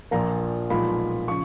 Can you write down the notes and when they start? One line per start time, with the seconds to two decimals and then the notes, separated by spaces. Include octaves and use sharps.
0.11 A#1 A#2 F3 A#3 A#5
0.70 B1 A#2 F3 G#3 B5
1.28 C#3 F3 C#6